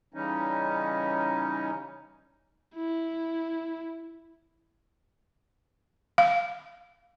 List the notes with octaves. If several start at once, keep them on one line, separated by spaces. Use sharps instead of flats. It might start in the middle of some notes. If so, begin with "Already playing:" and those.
C#3 E3 G3 C#4 D#4
E4
F5